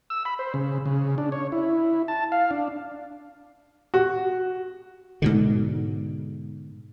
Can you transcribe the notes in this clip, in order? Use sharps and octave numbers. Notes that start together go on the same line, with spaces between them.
E6
B5
C5
C#3
C#3
D4
C#5
E4
A5
F5
D4
F#4
G#2 B2 D3